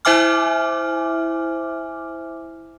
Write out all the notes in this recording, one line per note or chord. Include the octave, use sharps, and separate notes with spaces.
E4 C5 E5 G#5 D6 F6